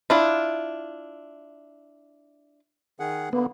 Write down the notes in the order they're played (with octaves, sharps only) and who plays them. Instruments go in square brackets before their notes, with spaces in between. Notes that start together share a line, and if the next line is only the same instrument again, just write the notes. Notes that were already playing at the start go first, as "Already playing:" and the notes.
[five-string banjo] D4 E4 F4
[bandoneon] D#3 G#4 F#5
[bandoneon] D3 A#3 [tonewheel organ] B3